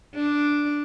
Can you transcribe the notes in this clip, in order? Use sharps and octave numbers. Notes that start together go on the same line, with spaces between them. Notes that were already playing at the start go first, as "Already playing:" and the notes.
D4